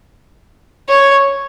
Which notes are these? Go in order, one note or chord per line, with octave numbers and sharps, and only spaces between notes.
C#5